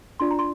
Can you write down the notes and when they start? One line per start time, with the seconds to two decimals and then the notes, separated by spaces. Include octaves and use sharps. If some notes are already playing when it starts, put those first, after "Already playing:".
0.20 D4 F4 D5 C6
0.31 A#5
0.39 C6